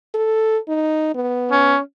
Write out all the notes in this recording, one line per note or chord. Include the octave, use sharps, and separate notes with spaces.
A4
D#4
B3
C#4